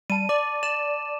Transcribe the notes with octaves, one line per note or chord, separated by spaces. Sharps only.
G3 A5 D#7
D5 D6
D5 E7